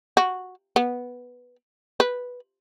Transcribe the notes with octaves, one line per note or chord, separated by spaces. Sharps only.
F#4
B3
B4